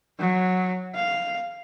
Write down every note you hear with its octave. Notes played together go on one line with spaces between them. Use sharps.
F#3
F5